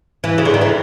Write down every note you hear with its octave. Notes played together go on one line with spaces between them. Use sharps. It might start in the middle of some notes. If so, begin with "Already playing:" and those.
E3
C#3
D3
D#3
E3